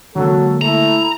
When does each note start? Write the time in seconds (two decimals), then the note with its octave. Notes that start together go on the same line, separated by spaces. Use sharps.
0.15 D3 F#3 G#3 A#3 A4
0.61 A3 E4 A#5